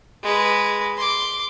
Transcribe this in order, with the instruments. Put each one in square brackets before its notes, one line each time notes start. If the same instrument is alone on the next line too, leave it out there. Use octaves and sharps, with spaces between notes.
[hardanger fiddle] G#3 B4
C6 D6